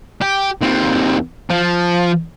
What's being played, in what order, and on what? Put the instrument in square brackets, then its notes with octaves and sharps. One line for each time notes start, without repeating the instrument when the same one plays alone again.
[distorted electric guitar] G4
D#2 C4
F3